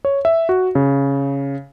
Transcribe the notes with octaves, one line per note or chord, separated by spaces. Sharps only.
C#5
E5
F#4
C#3